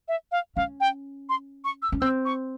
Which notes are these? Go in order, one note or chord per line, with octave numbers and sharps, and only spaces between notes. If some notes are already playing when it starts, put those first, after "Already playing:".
E5
F5
C#4 F5
G5
C6
C#6
E6
C#4
C4 E6
C#6